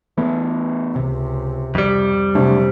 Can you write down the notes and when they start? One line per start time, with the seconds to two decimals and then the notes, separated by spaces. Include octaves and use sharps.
0.17 E3 A3 B3
0.96 C#2 C3
1.75 F2 G3
2.35 C3 F#3 A3 D4